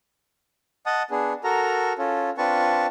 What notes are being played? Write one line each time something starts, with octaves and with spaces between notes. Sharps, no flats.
D#5 F#5 A5 D#6
B3 D4 G#4
F#4 A4 A#4 A#5
C#4 F4 A4
C4 D4 F4 B4 A5 C#6